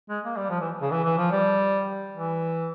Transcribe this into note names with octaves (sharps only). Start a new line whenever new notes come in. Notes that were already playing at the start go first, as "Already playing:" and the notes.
G#3
A#3
G3
F3
E3
C#3
E3
E3
F3
G3
E3